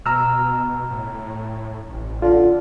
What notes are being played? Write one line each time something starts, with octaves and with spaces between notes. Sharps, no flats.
B2 A#5 E6 F6
A2
A1
D3 F4